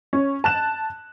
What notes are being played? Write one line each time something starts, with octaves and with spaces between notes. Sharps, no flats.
C#4
A5 F#6 E7